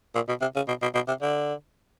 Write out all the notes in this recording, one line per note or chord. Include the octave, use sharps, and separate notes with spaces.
A#2
B2
C3
C#3
B2
B2
B2
C3
D3